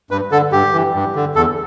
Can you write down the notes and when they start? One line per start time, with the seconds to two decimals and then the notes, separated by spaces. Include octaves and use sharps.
0.11 G2 B4
0.31 D3 A4
0.52 G2 G4
0.73 E3
0.95 G2
1.15 D3
1.36 E2 A4